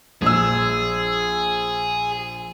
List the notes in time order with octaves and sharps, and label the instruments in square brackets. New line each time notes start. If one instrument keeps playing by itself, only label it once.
[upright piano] A#1 E6 [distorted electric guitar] G#4